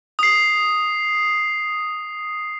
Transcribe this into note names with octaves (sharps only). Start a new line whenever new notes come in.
D#6 C7